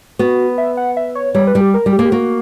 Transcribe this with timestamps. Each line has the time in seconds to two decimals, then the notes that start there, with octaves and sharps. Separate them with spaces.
0.19 B3 F#4
0.58 E5
0.77 F#5
0.97 E5
1.15 C#5
1.35 G3 C#5
1.47 B4
1.55 G3
1.61 G4
1.74 A#4
1.86 G3
1.93 G4
1.99 A#3
2.05 G4
2.12 A#3 F#4